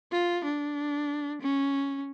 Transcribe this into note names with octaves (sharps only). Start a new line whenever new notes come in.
F4
D4
C#4